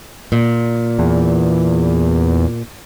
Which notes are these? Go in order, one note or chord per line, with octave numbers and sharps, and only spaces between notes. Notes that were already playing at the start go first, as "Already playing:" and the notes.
A#2
E2